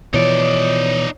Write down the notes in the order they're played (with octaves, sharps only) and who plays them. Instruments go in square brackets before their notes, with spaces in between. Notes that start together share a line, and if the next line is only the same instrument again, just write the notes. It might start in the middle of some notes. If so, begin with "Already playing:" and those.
[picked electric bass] B2 E3 F3 [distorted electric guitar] D#4 D5 [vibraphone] C#5